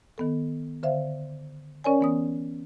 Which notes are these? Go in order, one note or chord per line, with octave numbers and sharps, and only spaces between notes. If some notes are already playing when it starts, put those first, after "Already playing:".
D#3 B3 A4
D3 C5 E5 F5
C#4 A#4 C#5 D5 G#5
E3 B3 D#6